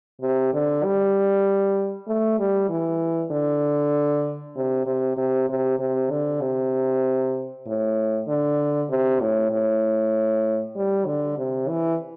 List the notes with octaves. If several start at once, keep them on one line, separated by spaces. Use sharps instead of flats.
C3
D3
G3
A3
G3
E3
D3
C3
C3
C3
C3
C3
D3
C3
A2
D3
C3
A2
A2
G3
D3
C3
E3